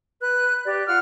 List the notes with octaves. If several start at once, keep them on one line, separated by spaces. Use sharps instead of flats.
B4 F#6
G4 D5
F4 F#5 F6 F#6